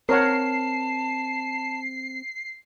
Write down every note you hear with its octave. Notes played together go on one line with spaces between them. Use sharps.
C4 A#4 C#5 F#5 A5 C7